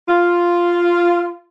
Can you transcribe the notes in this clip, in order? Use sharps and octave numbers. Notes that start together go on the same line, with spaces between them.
F4